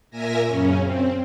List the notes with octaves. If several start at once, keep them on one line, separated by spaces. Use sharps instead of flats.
A#2 A#4 E5 G#5 A#6
F#2 C#3 C#4
C4